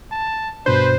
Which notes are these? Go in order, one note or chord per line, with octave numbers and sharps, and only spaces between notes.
A5
G2 B2 D4 B4 C5